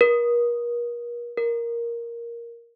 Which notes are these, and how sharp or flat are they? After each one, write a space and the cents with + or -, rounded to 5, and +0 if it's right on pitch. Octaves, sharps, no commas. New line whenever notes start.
A#4 +40
A#4 +5